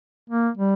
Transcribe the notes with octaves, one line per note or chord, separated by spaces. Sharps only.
A#3
G3